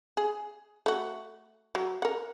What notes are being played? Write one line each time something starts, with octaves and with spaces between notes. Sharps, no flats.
G#4
A3 F#4
F#3
A#4 F#5